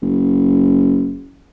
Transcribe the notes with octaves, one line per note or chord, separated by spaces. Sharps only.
F#1